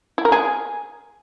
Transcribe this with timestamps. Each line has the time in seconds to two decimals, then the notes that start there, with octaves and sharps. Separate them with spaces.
0.18 E4
0.25 A#4
0.32 G#4